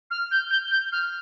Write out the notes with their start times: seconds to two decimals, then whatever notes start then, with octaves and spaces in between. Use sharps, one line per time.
0.11 F6
0.31 G6
0.51 G6
0.71 G6
0.92 F6